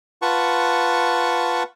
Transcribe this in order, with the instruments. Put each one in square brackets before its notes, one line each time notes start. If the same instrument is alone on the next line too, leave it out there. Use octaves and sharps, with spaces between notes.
[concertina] F4 B4 F#5 A5 C#6